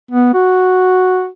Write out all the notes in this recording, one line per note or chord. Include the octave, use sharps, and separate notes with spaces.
B3
F#4